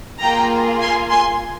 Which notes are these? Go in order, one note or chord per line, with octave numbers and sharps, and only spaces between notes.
A#3 F4 G#4 G5 A#5
G#5 C6
G#5 C6